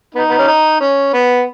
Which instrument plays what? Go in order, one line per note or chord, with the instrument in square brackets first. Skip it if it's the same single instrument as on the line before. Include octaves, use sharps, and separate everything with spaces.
[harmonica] B3 D#4
B3
C#4
D#4
C#4
B3